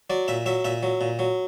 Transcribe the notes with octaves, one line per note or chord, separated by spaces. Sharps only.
F#3 D5
A#2 E5
F#3 E5
A#2 E5
F#3
A#2
F#3